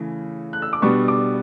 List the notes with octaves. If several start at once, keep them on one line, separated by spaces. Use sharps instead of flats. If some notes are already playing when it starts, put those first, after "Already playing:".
Already playing: C#3 E3 A3
F#6
E6
D6
B2 G3 B3 D4 C#6
D6